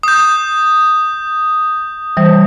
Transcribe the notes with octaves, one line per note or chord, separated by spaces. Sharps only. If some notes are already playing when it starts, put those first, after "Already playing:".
D#6 G6
E3 G3 C5